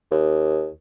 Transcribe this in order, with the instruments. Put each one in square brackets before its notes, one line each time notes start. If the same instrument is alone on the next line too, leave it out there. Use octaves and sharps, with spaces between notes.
[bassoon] D#2